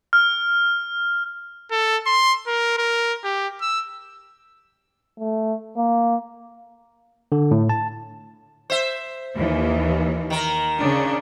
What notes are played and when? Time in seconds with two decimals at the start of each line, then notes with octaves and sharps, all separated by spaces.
0.13 F6
1.71 A4
2.06 C6
2.47 A#4
2.78 A#4
3.24 G4
3.61 E6
5.19 A3
5.77 A#3
7.32 D3
7.51 A2
7.69 A5
8.70 C5 E5
9.36 D#2 E3
10.30 D#3 A#4
10.78 C#3 D4